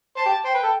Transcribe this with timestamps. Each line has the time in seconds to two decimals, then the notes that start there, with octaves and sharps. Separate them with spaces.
0.17 C5 A5
0.26 G4
0.45 C5 G5
0.54 B4
0.63 A4